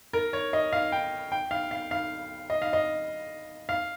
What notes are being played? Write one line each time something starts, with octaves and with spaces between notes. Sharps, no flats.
A#4
C#5
D#5
F5
G5
G5
F5
F5
F5
D#5
F5
D#5
F5